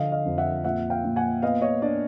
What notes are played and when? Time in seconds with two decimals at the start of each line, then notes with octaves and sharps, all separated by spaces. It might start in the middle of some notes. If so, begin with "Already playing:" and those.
Already playing: D3 F3 D#5 F5
0.12 D#5 F5
0.25 F2
0.38 E5 F#5
0.64 A#2 E5 F#5
0.90 F5 G5
1.04 A#2
1.16 F#5 G#5
1.42 B3 D#5 F5
1.62 C#5 D#5
1.82 D4 D5